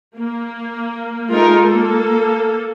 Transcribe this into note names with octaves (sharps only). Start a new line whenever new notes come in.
A#3
G#3 A3 D#4 F4 A#4
A#3 A4